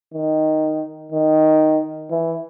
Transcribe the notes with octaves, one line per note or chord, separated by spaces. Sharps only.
D#3
D#3
E3